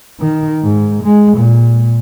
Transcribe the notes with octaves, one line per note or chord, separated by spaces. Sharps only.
D#3
G#2
G#3
A#2